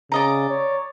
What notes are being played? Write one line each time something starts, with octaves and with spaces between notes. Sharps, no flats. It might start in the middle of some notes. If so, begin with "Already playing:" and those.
C#3 D5 D#5 A#5
C#5